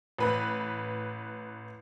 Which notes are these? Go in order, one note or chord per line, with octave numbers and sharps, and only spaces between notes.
A1 B4 B5